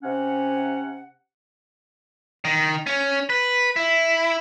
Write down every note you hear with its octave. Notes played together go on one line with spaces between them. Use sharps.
C3 C#4 F#5
D#3
C#4
B4
E4